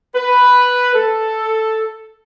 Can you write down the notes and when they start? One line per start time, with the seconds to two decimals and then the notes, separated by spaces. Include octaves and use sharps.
0.14 B4
0.94 A4